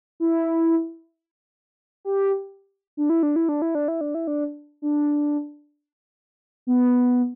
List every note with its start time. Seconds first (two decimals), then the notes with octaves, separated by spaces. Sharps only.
0.20 E4
2.05 G4
2.97 D4
3.10 E4
3.23 D4
3.36 E4
3.49 D4
3.62 E4
3.75 D4
3.88 E4
4.01 D4
4.15 E4
4.27 D4
4.82 D4
6.67 B3